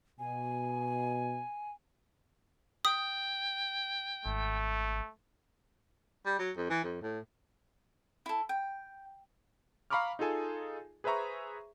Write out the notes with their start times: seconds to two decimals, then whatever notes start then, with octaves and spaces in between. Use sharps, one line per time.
0.19 B2 G#5
2.85 G5 D#6
4.25 G#1 A3
6.26 G3
6.39 F#3
6.56 F2
6.70 E3
6.84 F2
7.01 A2
8.26 E4 A4
8.49 G5
9.90 F5 A#5 B5 C#6 D6 F6
10.19 D#4 F4 G#4 A4 G#5
11.04 G#4 B4 C5 E5 A#5 C#6